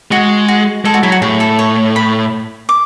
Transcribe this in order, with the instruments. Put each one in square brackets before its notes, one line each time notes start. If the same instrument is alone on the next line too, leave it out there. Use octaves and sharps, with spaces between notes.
[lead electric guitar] G#3 [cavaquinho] F#4
[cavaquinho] F#4
[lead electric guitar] G#3 [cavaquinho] A4
[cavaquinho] F#4
[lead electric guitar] F#3 [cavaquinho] E4
[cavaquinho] F#4
[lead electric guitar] A2 [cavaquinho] G#4
[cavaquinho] A4
C#5
B5
D6